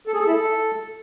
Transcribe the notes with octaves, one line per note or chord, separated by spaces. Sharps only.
A4
G#4
A4
E4
A4